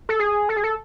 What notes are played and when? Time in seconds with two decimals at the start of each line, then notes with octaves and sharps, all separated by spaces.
0.09 A4
0.19 G#4
0.49 A4
0.56 G#4
0.64 A4